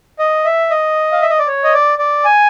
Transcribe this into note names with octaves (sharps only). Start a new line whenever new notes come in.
D#5
E5
D#5
F5
E5
D#5
D5
C#5
D#5
D5
D5
G#5